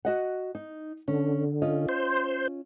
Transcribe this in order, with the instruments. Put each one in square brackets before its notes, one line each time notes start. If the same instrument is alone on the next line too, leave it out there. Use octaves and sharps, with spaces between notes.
[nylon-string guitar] F#4 D#5 F#5
D#4
[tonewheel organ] D3 [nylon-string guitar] C#4
[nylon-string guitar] C#4 F4 D#5
[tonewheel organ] C5